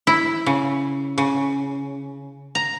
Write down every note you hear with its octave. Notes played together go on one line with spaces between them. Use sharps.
E4
C#3
C#3
A#5